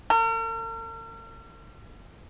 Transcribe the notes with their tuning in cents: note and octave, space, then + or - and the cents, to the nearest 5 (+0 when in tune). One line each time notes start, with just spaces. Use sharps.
A#4 -45